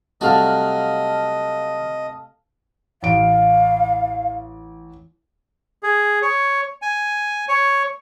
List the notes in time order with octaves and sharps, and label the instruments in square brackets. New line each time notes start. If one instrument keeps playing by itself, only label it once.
[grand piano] C3 G3 A3 [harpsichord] F#3 F#4 [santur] A4 F5 [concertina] D#5
[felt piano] A1 D7 [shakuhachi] F5
[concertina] G#4
C#5
G#5
C#5